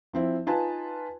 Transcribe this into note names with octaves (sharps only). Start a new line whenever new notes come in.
F3 C4 E4
D#4 F4 B4 G#5 A5